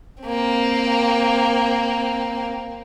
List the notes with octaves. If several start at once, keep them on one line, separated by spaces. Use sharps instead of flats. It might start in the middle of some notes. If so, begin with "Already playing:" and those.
A#3 C4